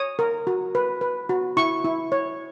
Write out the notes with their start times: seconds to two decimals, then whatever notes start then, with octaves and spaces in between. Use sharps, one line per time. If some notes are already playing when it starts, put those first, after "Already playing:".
Already playing: C#5 D#6
0.19 A#4
0.47 F#4
0.75 B4
1.01 B4
1.29 F#4
1.57 E4 C#6
1.84 E4
2.12 C#5